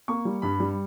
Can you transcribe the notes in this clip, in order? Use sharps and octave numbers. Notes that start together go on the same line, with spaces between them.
A#3 C#6
G3
G2 B5
G3